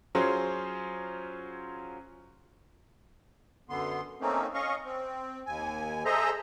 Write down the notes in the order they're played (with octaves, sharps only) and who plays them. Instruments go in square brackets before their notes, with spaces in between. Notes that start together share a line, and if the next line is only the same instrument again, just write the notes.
[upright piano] F#3 C#4 F4 G#4 C5
[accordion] F#2 D3 B3 C6
A3 A#3 C4 C#4 D#4
C#4 D#5 F5 C#6
C4
D#2 G#5
G#4 A4 C5 D#5 E5 A#5